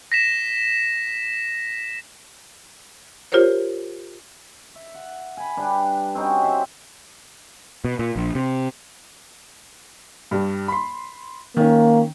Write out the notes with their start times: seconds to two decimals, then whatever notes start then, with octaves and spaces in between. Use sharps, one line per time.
0.12 A#6 B6 E7
3.32 F4 G4 A#4 C5 C#5
4.75 E5
4.94 F#5
5.37 G#5 B5
5.57 G3 D4 B4
6.15 C4 C#4 D#4 F#4
6.42 G4 C5 E5
7.85 B2
7.99 A#2
8.16 A#1
8.35 C3
10.31 G2 G3
10.68 B5 C6
11.57 D#3 A#3 C#4